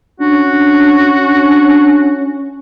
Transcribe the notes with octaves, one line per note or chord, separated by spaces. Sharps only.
C#4 D4 F#4